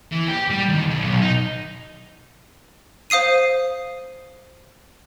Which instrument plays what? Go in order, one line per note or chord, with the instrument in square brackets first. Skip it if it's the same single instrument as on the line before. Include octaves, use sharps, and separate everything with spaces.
[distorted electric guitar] E3
G4
G3
D#2
B1
B1
D#4
[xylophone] C5 F5 D#6 C7 D#7